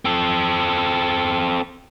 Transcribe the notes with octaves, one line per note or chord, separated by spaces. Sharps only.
C4 A4